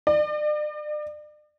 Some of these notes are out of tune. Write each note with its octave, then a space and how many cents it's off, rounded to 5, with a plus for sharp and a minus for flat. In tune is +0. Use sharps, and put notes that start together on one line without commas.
D5 +45